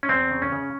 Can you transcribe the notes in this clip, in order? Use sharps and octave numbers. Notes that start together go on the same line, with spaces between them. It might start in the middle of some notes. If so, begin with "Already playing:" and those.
C#4
E2 C4
C#3
C#4
C#3